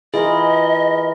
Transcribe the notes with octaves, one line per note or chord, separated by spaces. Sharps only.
E3 F4 G#4 A#4 D#5